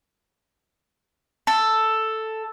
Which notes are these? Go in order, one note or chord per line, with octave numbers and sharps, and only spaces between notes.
A4